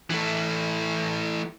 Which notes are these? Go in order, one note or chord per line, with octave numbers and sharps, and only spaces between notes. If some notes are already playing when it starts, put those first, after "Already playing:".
E3 A3